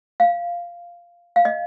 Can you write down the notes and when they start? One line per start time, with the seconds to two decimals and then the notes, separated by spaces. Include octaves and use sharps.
0.20 F5
1.36 F5
1.45 D#5